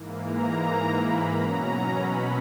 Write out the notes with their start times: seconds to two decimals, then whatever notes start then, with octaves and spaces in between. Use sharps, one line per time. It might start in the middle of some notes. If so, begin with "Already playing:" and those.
Already playing: G#2 E3 A#3
0.24 A#5
0.95 B5
1.29 B2 F#3 C#4 A#5
2.00 B5